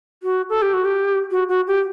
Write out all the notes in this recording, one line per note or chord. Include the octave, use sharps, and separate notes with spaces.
F#4
A4
G4
F#4
G4
F#4
F#4
G4